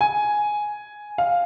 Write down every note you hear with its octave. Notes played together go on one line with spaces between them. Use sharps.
G#5
F5